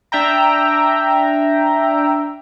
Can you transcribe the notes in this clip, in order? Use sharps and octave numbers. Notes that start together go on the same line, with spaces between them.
D4 E5 G5 A#5